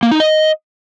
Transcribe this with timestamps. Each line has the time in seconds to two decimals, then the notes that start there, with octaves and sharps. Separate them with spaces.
0.03 A#3
0.11 D#4
0.20 D#5